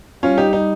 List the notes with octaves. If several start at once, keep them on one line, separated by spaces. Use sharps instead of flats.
G3 C#4 F4
D#4 G4
D#4